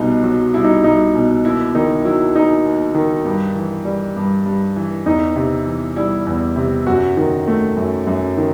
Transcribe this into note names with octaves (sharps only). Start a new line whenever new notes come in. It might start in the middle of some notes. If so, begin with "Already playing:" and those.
Already playing: C2 B2 D#4
F#3
C2 E4
D#4
C2 D#4
B2
D#2 E4
D#3 D#4
F#3 E4
D#2 D#4
D#2
D#3
G2
E3
G3
G2
G2
E3
E2 D#4
C3
E3
G3 E4
E2
C3
F#2 F#4
D#3
A3
F#2
F#2
D#3